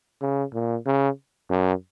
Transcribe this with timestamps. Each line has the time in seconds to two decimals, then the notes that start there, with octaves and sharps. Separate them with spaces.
0.21 C#3
0.54 A#2
0.86 C#3
1.50 F#2